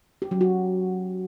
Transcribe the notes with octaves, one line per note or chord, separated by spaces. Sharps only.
G4
F#3
F#4